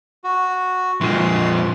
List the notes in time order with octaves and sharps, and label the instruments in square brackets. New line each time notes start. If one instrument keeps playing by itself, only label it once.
[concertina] F#4
[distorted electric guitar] F2 A#2 [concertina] C6